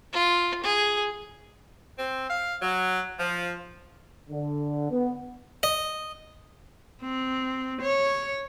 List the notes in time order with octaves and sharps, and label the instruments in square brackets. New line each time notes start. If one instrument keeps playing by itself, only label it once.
[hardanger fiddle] F4
G#4
[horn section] C4
F5
F#3
F3
[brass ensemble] D3
B3
[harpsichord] D#5
[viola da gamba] C4
C#5